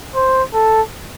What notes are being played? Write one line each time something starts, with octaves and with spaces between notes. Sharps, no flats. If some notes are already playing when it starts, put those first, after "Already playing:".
C5
A4